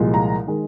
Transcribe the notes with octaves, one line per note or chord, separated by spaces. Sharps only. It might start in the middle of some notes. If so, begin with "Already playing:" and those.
Already playing: C2 A#2 F3 G#3
A#5
D#3 G#3